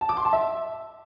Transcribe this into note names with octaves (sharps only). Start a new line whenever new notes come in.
A5
D6
C6
A5
E5